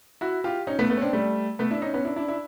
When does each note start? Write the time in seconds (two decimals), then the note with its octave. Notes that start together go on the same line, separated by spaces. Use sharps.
0.21 E4 F#4
0.44 F4 G4
0.67 C#4 D#4
0.79 A3 B3
0.90 A3 B3
0.97 C#4
1.01 C4 D4
1.13 G3 A3
1.59 A3 B3
1.71 D4 E4
1.82 C#4 D#4
1.94 B3 C#4
2.05 D4 E4
2.16 D4 E4
2.28 D4 E4